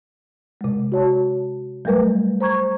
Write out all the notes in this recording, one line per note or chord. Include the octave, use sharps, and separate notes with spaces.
C3 G#3
F#4 C#5 A5
F#3 G3 A3 A#4 B4
C5 A#5 C#6 G#6